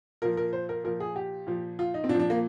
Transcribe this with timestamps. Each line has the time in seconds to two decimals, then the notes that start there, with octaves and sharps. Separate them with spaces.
0.22 A#2 F3 A#4
0.37 A#4
0.53 C5
0.69 A#4
0.84 A#2 F3 A#4
1.00 G#4
1.16 G4
1.47 A#2 F3
1.79 F4
1.94 D#4
2.04 C4
2.09 A#2 D4
2.14 F3
2.19 D4
2.30 A#3